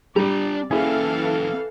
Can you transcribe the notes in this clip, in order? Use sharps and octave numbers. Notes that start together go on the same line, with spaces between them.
G3 D4 D5 A#5
E3 A#3 C#4 E4 G#4 A4 F5